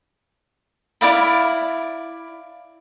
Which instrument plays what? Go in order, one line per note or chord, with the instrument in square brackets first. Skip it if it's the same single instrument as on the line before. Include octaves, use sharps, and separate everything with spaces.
[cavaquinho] E4 D5 F5 B5